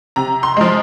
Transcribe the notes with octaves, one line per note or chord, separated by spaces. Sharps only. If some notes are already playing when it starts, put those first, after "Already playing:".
C3 A#5
C6
F3 G#3